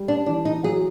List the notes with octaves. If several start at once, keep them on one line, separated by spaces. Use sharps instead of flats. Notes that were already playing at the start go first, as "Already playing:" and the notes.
Already playing: G3
D4
E3 D4
D#4
F#3 G#4